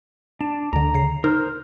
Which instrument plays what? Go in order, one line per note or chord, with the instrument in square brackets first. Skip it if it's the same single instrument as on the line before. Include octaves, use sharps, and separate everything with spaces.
[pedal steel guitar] D4 [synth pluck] E7
[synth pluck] D2 D3 [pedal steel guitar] A#5
[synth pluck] C#3 C7
[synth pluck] D#4 [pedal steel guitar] A#4 C5 F6